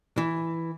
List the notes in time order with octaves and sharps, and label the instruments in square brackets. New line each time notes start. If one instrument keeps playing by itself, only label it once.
[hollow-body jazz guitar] E3